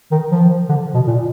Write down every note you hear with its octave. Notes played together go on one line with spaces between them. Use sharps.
D#3
F3
D3
B2
A#2